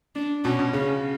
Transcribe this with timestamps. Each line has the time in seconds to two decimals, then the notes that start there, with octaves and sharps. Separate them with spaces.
0.15 D4
0.44 B2 C#4
0.59 B2
0.73 C#3 C#4